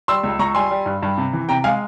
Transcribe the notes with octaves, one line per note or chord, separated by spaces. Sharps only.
G3 C6 E6
C#2
C#2 A#5 C#6
G3 G#5 C6
G3
G2
G2
C3
E3
C3 G5 A#5
G#3 F5 G#5